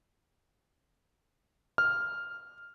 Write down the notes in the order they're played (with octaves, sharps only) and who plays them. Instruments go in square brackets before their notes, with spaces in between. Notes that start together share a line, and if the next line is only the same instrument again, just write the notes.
[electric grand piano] F6